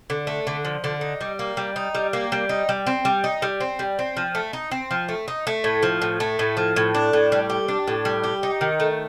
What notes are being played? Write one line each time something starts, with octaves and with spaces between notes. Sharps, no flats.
D3
A3
D3
F3
D3
D#4
G3
A#3
G3
D#4
G3
A#3
G3
D#4
G3
C4
G3
D#4
G3
C4
G3
C4
F3
A3
D#4
C4
F3
A3
D#4
A3
A2
F3
A2
A3
A2
F3
A2
D4
A2
G3
G4
D4
A2
G3
G4
D#4
D#3
A3